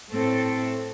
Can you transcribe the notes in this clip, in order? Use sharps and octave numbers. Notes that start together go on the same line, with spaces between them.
A2 A3 C4 A4